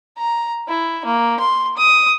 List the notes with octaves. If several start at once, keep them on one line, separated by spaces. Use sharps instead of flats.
A#5
E4
A#3
C6
D#6